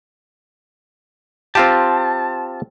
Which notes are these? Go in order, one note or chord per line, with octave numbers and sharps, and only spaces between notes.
C4 F4 G4 A5